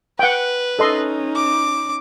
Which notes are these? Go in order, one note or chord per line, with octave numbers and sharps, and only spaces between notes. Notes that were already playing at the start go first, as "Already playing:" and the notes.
B4 F#5 G5
C#4 D#4 A4 D#5 C6
D6